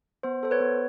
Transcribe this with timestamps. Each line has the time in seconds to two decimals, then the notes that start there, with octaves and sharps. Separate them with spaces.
0.23 B3 C5
0.43 A4 C5
0.51 B4 C#5
0.60 B3